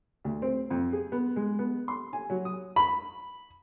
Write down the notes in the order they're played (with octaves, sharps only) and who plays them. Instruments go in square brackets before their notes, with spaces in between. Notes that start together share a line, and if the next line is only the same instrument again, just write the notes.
[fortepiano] D2
C4
F2
G#4
B3
G#3
B3
C6
G#5
F#3
D#6
B5